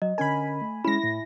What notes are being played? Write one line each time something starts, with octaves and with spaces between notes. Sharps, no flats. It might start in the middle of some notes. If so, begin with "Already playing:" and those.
F#3 D#5
D3 C#4 A#4 G#5 B5
A3
G#3 C#4 E4 B5 A#6
A2